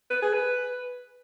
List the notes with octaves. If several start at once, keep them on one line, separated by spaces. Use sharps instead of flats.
B4
G#4
B4